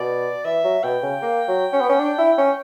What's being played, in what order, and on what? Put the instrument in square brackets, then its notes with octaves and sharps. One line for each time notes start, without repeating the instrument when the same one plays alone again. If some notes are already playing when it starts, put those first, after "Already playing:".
Already playing: [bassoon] B2 [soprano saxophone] D5
[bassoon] E3 [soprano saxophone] E5
[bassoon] F#3
[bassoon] B2 [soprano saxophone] G5
[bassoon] C#3
A#3
F#3
C#4
B3
C#4
D4
E4
C#4